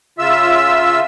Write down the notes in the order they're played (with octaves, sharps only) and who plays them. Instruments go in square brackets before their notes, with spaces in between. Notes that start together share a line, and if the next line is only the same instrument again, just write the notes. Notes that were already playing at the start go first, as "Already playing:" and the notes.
[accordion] C#3 F4 E5 E6